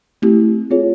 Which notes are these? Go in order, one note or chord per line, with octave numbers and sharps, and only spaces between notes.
A3 C4 E4 G4
C4 F4 G#4 C#5